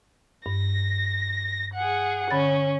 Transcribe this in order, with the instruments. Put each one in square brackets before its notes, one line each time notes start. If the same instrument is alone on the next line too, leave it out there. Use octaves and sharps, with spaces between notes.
[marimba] G2 [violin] A#6
[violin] G#4 F#5
[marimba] D3 B5 A6 [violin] C#4